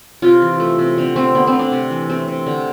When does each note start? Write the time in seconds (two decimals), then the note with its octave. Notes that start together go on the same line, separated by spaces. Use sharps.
0.22 C3 F4
0.42 E3
0.60 A3
0.78 C3
0.98 D3 C4
1.16 A3 C4
1.35 D3 B3
1.47 C4
1.52 A3
1.59 D4
1.72 C3
1.90 E3
2.09 A3 C4
2.28 C3
2.46 D3